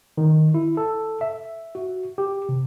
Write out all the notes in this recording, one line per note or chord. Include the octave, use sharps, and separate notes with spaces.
D#3
E4
A4
E5
F#4
G4
C3